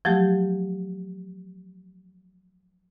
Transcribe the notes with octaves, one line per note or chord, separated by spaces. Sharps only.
F3 F#3 A3 G4